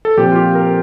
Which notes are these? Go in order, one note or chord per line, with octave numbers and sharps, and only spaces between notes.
A4
A#2 F3 C4 G4
F4
G4
A#4